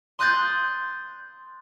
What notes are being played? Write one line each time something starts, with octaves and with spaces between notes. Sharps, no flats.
C6 D#6 F#6 G6 A6